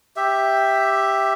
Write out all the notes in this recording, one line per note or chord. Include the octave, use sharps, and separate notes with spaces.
G4 E5